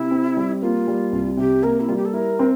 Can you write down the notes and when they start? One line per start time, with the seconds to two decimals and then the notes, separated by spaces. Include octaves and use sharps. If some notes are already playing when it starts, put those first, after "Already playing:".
Already playing: C3 E4
0.11 C4
0.37 G3
0.62 A#3 F4
0.88 G3
1.12 C2
1.37 C3 G4
1.62 A#3 A#4
1.80 E4
1.88 G3 F4
1.97 G4
2.05 A4
2.13 E4 A#4
2.39 C4